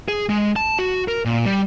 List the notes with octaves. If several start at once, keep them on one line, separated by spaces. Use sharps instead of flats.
G#4
G#3
A5
F#4
A#4
A#2
G3